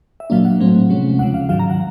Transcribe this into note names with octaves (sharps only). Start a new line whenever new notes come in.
E5
A#2 F#3 A#3 D4 F5
F#5
A2 F#3 A3 C4
C3 F3 G#3 C#4
D#2 C#3 F3 F#5
F5
G#2 D#3 F#3 F5
A#5
F#5